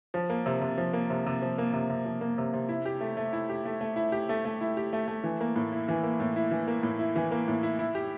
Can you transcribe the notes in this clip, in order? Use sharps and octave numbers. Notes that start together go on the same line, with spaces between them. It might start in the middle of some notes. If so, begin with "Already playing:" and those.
F3
A#3
C3
C3
F3
A#3
C3
C3
F3
A#3
C3
C3
F3
A#3
C3
C3
E4
G4
A3
A3
E4
G4
A3
A3
E4
G4
A3
A3
E4
G4
A3
A3
E3
A#3
A2
E4
E3
A#3
A2
E4
E3
A#3
A2
E4
E3
A#3
A2
E4
E4
G4